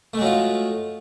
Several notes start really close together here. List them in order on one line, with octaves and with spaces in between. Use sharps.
A3 G#3 F#3 F4